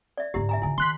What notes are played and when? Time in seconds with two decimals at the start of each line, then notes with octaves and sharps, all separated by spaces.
0.17 D5 E5
0.34 D2 G#2 E4 G4
0.49 E5 G#5 A#5
0.62 D3 E4 F4 G#5
0.78 D#3 C6 F#6 B6